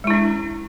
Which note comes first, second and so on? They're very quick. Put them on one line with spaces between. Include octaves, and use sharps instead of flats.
G#3 E4 D4 C#4